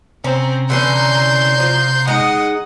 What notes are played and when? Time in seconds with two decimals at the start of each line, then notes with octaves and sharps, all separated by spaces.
0.24 C3 C4 C#4 A#5
0.70 D3 E3 C#4 C6 G6
1.60 F3
2.07 G#3 D#4 D#5 F#5